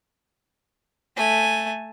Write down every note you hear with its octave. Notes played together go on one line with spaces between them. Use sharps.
A3 G#5